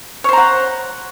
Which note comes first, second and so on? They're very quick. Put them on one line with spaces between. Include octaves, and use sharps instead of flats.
C#5 C5 A#5 F#5